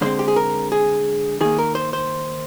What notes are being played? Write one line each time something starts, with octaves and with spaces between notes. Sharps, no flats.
D3 G#3 C4 C5
G4
G#4
A#4
G#4
D#3 A#3 G#4
A#4
C5
C5